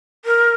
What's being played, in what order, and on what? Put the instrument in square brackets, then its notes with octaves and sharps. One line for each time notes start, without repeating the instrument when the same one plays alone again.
[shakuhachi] A#4